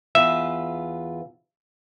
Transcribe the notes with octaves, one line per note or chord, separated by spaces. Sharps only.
E2 F4 B4 E5